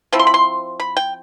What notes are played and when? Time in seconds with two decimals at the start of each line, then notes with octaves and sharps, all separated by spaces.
0.13 F3 C4 E4
0.19 C6
0.27 B5
0.34 C6
0.80 B5
0.97 G5